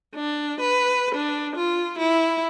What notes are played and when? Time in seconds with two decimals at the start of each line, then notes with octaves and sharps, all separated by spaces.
0.15 D4
0.61 B4
1.15 D4
1.56 F4
1.99 E4